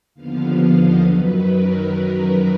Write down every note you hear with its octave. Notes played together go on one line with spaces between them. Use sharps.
D#2 D3 F3 B3 F5
F5
D#5
F#2 D#3 F#3 B4
A#4
B4